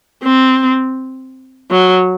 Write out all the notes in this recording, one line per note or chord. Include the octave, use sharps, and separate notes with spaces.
C4
F#3